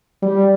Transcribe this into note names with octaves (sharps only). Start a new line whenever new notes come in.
G3